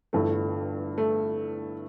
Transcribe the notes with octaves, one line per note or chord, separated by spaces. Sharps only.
G1 G2 E3 A3
A3